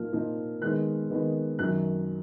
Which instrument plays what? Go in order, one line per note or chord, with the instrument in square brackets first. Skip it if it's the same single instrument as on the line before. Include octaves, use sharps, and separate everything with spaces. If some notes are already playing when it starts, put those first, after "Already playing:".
Already playing: [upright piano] A#2 F3 A#3 D#4 F6
A#2 F3 A#3 D#4
D#3 G#3 B3 D#4 F#6
D#3 G#3 B3 D#4
F#2 D#3 F#3 F#6